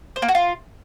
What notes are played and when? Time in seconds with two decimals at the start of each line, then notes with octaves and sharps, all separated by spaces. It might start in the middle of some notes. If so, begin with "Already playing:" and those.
0.16 C5
0.22 A#3
0.28 F#4
0.35 F4